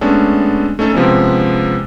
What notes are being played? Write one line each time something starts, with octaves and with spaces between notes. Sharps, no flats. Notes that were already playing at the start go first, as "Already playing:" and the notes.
G#3 A3 B3 C#4 D4 A4
A3 C#4 D#4 A4
C3 F3 G#3 B3 C#4